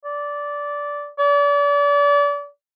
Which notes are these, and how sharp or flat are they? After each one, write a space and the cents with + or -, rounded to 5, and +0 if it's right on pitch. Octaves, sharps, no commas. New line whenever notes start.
D5 -15
D5 -35